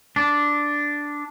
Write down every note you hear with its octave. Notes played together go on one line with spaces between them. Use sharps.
D4